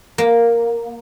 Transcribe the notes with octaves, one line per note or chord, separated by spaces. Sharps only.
A#3